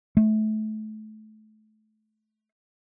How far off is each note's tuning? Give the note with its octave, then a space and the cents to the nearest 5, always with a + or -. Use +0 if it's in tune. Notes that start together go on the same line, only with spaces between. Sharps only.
A3 -30